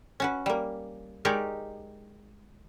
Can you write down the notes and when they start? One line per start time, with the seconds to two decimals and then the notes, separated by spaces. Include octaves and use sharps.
0.20 C#4 F#4 B4
0.46 G3 A#3
1.25 G#3 D#4 G4 A#4 C#5 D5